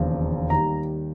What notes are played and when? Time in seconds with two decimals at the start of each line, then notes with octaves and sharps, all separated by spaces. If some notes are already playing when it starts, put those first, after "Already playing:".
Already playing: E1 D#2 C#3 F3
0.50 D#2 D#3 G3 A#5